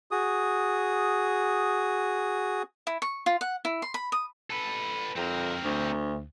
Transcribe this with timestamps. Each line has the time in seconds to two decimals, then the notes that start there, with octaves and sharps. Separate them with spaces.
0.11 F#4 G#4 D#6
2.87 E4
3.02 C#6
3.26 F4
3.41 F#5
3.65 E4
3.82 C6
3.94 B5
4.12 D#6
4.50 A4 B4
5.16 F2 C4 A#4
5.63 D2